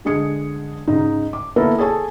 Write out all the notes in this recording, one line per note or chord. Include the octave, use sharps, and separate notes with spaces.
D3 G#3 G#4 C#7
G#2 C#3 D#4
D6
A#3 B3 E4 A4 A#4
G#4 A4 C#5 G#5 A5